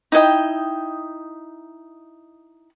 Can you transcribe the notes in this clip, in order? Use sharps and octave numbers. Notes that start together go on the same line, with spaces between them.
D#4 E4 D#5 G5